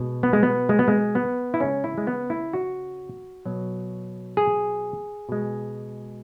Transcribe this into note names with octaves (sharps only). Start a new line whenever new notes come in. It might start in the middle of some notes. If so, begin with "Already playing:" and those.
Already playing: B2 G#3
B3
G#3
B3
G#3
B3
G#3
B3
E4
C#3 G#3 C#4
E4
G#3
B3
E4
F#4
B2 F#3
G#4
B2 G#3